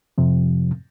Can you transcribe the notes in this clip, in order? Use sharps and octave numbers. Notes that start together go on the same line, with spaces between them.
F2 C3 F3